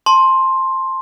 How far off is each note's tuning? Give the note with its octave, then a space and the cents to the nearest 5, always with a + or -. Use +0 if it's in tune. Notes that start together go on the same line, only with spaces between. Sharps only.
A5 +0 C6 +10